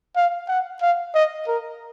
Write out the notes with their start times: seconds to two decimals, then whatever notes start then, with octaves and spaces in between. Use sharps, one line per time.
0.16 F5
0.48 F#5
0.82 F5
1.15 D#5
1.47 A#4